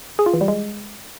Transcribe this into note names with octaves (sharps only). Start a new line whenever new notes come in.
G#4
F4
E3
G3
G#3